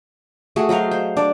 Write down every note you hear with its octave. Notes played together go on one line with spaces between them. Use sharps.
A3 F#4 G#4
F#3 C5 D#5 F5
C5
D4 D5